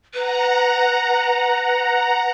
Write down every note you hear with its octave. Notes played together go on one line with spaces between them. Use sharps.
B4 F#5 A#5